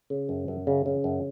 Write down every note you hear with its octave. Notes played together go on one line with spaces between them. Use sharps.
C#3
F#2
F#2
C#3
C#3
F#2